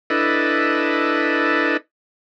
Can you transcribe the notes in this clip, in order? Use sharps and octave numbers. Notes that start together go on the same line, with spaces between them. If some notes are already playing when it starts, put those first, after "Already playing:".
D4 E4 A4 B4 D#5